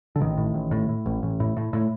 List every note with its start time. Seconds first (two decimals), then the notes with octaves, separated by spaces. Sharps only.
0.16 D3
0.20 A1 D#3
0.38 A2
0.54 A1
0.71 A2
0.89 A2
1.06 A1
1.23 A1
1.40 A2
1.57 A2
1.73 A2